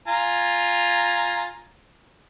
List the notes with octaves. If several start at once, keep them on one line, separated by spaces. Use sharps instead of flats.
F4 G#5 A#5